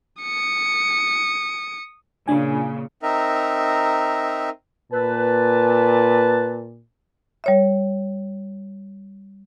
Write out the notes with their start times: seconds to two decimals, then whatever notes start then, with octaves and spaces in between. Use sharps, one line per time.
0.22 D#6 C#7
2.28 A#2 C#3 D4 G#5
3.03 C4 D#4 A#4 E5
4.92 A#2 B4 A5
7.44 G3 C#5 E5